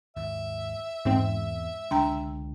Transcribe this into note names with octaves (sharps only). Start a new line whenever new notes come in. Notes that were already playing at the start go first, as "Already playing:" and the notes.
D#2 G#2 E5
E2 G#2 E3 C4
C#2 D3 G#3 D4 G5 A#5